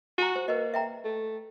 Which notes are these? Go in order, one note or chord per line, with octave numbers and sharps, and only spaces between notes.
F#4 G#5 A#5
C5
A#3 B4 D#5
E5 G5 A#5
A3